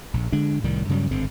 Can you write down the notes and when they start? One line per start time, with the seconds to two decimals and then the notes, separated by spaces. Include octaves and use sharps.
0.14 A#1
0.32 D3 G#3 D4
0.64 C2 A2 D#3 G3
0.89 G2 C#3 F#3 G3
1.11 G#1 G2 D3 C4